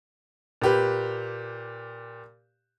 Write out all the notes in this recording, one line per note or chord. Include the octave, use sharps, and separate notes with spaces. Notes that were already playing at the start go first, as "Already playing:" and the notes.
A#2 G4 B4